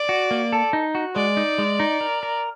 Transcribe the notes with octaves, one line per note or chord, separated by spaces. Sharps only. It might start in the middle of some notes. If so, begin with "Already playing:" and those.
Already playing: D5
F#4
A#3
A4
D#4
F#4
G#3 D5
D#4
G#3
D#4
A#4
A#4